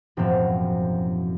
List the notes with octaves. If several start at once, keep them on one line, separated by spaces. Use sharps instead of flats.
E1 F#2 A2 F3 C4 F5